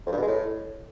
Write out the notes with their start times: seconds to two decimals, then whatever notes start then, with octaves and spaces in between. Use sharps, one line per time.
0.07 F2
0.12 G2
0.17 B2
0.23 G#3
0.28 A2